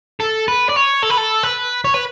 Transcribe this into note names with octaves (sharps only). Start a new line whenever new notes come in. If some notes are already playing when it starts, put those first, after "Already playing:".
A4
B4
D5
C#5
A4
B4
A4
B4
C#5
B4